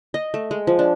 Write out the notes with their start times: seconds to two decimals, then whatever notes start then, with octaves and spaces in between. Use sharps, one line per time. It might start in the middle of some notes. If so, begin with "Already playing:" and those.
0.14 D#5
0.34 A3
0.51 G#3
0.67 F3
0.79 D4